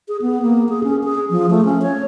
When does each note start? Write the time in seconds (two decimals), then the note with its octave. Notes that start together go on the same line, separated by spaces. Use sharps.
0.08 G#4
0.22 B3
0.42 A#3
0.69 G#4
0.84 C#4
1.04 G#4
1.30 F3
1.50 A3
1.65 C#4
1.82 C#5